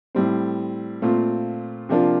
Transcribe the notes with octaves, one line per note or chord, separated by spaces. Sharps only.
A2 G3 C4
A#2 A3 C4 F4
C3 F3 A#3 D4 F4